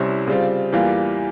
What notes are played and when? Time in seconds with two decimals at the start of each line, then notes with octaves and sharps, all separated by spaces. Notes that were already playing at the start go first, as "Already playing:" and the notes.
Already playing: C2 C3 G3 C#4 E4
0.27 C#3 G3 C4 F4
0.73 E2 E3 G3 A#3 F4